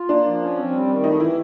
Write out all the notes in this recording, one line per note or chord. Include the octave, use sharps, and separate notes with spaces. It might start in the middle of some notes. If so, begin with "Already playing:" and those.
Already playing: F4
A#3 D4
F3
C#4
C4
G3
D#3
A3 D#4
E3 E4